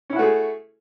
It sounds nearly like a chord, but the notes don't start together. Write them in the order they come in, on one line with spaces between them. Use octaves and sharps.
C#4 E4 F#4 A3 G#4